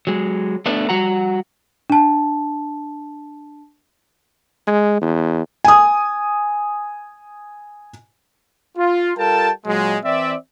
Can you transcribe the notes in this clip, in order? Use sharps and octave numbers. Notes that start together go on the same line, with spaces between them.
F#3 G#3
A3 B3 D4 B4
G3 F#4 F#5 A#5
D4 A5
G#3
E2
G#5 D#6
F4
G3 F4 A4 A#4 G5 A5
A#2 F#3 G#3
E3 C4 D5 E5